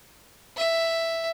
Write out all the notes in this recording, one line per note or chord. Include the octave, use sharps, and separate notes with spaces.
E5